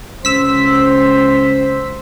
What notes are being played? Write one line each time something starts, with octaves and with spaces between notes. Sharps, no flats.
C#2 C5 E6 B6